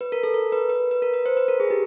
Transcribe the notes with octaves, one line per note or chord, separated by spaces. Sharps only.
B4
A#4
A4
A#4
B4
B4
B4
A#4
B4
C5
B4
A#4
G#4
G4